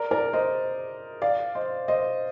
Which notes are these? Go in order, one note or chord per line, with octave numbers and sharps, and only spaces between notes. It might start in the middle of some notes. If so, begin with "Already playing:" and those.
Already playing: A#4 D5
A#4 D5
C5 D#5
D5 F5
C5 D#5
C5 D#5